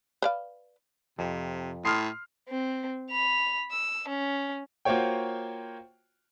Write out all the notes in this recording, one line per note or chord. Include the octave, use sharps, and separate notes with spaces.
B4 D5 F5
F2 C3
A2 C6 D#6 F6 C7
C4
B5 F7
E6
C#4
A#3 F4 F#4 C5 C#5 G5